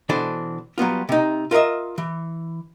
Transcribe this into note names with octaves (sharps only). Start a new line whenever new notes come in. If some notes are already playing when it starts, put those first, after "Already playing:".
B2 E3 D4 A4 C5
F#3 G3 B3 F4
C3 D#4
F4 A#4 C5 D#5 E5
E3